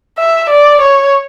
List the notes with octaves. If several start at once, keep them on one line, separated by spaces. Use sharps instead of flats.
E5
D5
C#5